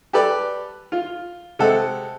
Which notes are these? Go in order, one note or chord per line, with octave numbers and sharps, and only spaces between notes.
G4 A4 B4 D5
F4
C3 G#3 A4 F#5